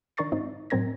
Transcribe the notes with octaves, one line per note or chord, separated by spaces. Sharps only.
D#3 D4 A#4 C#6 A6 C7
G#2 C4 D#4
A2 F#3 C4 A#4 G#6 A#6